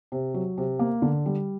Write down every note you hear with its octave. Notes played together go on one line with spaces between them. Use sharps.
C3
F#3
C3
A#3
D3
G3